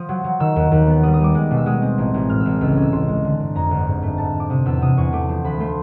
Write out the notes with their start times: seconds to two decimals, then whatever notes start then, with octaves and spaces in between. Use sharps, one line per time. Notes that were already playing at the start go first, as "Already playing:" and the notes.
Already playing: F3 D#6
0.09 F#3
0.24 F#3
0.40 D#3 E6
0.56 D#2
0.72 D#2
0.87 B3
1.03 G3 D#6
1.14 D#6
1.19 G3
1.24 D6
1.35 G#3
1.51 B2
1.57 E6
1.66 G#3 D#6
1.82 C4
1.98 A1
2.14 A1
2.30 A2 F6
2.40 E6
2.46 A1
2.51 F6
2.61 C#2 E6
2.72 E6
2.77 C#4
2.82 E6
2.92 C#2 C6
3.09 G#3
3.24 D3
3.40 G1
3.55 F2 A#5
3.71 G1
3.87 G#2
4.03 A3
4.18 G#2 A5
4.34 F3
4.40 D6
4.50 C3 D#6
4.65 E2 E6
4.81 C3 D#6
4.97 E2 C#6
5.13 A3 D6
5.29 F3
5.44 D2 B5
5.60 A3 C6